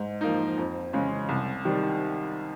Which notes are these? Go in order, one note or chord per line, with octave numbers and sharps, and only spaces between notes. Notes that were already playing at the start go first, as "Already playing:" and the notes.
Already playing: G#2
F3 A#3 D#4
F2
C#3 G#3 C#4
C2
C3 D#3 G3